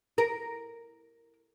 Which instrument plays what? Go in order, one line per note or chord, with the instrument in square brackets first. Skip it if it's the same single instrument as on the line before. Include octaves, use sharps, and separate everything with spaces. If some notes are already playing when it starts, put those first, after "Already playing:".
[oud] A#4